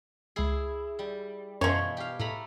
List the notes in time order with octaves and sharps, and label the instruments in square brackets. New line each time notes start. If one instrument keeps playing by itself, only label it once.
[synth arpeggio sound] C#2 C7 [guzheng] E4 G#4
[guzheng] G3
[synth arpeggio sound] F#2 [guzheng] B2 E3 [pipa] F3 C#5
[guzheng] G4 F5
[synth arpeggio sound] A2 [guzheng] A3 A#5 B5